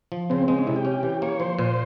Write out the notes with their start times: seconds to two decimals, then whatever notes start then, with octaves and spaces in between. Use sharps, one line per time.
0.12 F3
0.30 C#3 C4
0.48 G#3 C4
0.58 C#4
0.67 C3 E4
0.76 G4
0.85 C#4
1.03 E3
1.22 A#3 C#5
1.40 F3 C5
1.59 A#2 C5